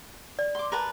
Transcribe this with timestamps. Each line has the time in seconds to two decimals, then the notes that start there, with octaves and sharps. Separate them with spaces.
0.39 D5
0.55 C6 D6
0.72 A#4 B4 A5